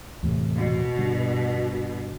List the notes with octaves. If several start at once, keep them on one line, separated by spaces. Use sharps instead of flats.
E2 A2 C3
B2
G2 D3